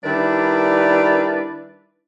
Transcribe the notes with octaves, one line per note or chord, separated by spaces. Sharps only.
D#3 G3 D4 E4 B4 D5